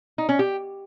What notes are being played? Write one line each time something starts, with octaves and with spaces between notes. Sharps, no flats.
D#4
C#4
G4